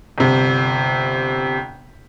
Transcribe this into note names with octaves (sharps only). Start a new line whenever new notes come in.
G1 C3